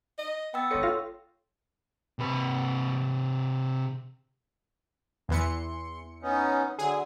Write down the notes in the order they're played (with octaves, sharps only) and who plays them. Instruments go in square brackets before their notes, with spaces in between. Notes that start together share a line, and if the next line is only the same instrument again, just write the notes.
[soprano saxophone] D#5
[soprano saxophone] B3 [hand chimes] G5 E6 A6
[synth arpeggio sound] G#1 D#5 C#7 [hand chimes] A4 C#5 C6
[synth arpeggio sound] F4 F5 A#6
[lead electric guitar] C3 B4
[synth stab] E2 E3 C#7 [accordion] C6
[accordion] B3 C#4 D#4
[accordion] D3 F#3 [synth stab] G#4